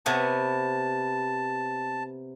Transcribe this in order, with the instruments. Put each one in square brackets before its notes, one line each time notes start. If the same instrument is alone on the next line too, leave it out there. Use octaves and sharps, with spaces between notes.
[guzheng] C3 B3 C#5 [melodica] A5